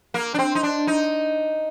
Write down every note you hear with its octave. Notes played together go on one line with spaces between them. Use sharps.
A#3
D4
C4
D#4
D4
D#4